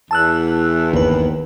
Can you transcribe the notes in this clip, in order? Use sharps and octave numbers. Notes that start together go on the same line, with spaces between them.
E2 A5 E6 F#6
G1 D#2 B4